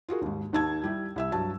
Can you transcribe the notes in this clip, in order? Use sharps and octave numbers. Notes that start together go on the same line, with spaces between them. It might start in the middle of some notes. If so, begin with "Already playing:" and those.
F4 F#4 G#4 A#4
D#2 G#2
D#2 D#3 A5 E6 G#6
G3 E4 G4
C2 E5 E6
G2 F#3 A5